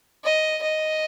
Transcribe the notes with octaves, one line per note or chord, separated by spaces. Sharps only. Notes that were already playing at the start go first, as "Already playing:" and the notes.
D#5
D#5